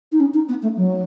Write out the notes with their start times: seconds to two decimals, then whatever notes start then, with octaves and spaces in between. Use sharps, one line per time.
0.12 D#4
0.19 C#4
0.33 D#4
0.48 B3
0.62 A3
0.76 F#3